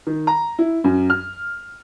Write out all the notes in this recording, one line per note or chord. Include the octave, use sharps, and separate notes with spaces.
D#3
A#5
E4
F#2
F6